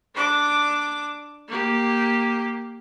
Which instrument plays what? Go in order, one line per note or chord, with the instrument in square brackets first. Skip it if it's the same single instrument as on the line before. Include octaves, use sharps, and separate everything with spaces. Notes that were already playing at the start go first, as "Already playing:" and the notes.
[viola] D4 D6
A#3 G4